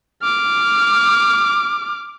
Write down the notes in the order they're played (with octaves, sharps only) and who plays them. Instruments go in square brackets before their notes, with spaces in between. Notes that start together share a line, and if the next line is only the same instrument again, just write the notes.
[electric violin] D6 F6